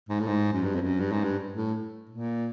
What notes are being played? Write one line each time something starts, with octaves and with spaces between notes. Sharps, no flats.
G#2
A2
G#2
F#2
G2
F2
F#2
G2
G#2
G2
A2
A#2